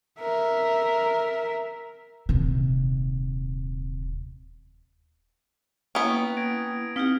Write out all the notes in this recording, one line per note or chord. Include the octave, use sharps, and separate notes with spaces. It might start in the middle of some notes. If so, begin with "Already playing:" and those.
A#4 E5
D#1 C3
A#3 B3 C#4 E4 G5 D#6
G#6 A#6 D7
C4 D#4 E4 G4 F6 B6